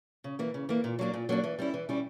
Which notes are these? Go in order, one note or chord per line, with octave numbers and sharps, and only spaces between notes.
C#3
E3 A#3
C#3
E3 A#3
A#2
F#3 A#3 D4
A#2
F#3 A#3 D4
E3
G3 C#4 E4
E3
G3 C#4 E4